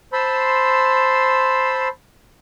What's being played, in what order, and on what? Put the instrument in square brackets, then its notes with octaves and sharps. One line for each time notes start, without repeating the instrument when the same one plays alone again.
[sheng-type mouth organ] C5 A5 B5 C6 E6